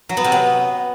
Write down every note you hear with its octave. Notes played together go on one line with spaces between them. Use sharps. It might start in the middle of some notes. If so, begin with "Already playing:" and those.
F#3
B3
C3
B3